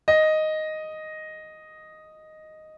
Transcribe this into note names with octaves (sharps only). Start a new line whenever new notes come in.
D#5